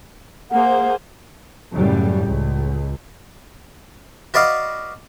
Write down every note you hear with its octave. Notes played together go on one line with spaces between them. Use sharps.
A#3 G#4 C5 F#5
F#2 A2 C#3 G3
C#2
F#4 B4 D5 D#5 F5